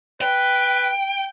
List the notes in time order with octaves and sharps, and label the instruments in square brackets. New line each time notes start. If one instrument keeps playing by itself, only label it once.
[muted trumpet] B4 [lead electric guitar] G5